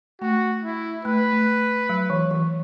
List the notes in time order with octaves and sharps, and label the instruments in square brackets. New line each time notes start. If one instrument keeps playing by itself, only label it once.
[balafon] A3 [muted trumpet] F#4
[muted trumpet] E4
[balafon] A3 [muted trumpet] B4
[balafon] A3
F#3
E3
E3